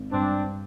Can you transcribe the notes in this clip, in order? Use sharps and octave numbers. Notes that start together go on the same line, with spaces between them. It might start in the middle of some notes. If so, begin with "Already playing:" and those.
Already playing: G#1
G2 C4 D4